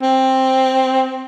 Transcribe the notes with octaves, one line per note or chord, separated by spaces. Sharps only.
C4